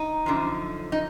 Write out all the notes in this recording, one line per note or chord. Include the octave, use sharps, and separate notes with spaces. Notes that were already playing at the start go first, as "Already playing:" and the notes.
Already playing: D#4
F#2 D3 F3
D#4